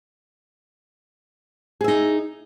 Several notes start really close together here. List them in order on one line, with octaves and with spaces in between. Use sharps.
G#4 E5 D#4